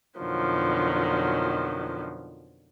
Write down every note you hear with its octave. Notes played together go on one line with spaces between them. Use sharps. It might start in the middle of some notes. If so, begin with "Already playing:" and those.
F2 B2 D3 D#3 F3 F#3